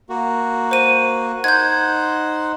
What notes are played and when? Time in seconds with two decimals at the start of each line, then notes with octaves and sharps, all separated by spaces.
0.09 A#3 F#4
0.71 C5 D#7
1.44 D#4 C5 F#5 G6 G#6